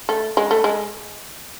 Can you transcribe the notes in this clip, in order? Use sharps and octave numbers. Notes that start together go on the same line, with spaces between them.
A3
G#3
A3
G#3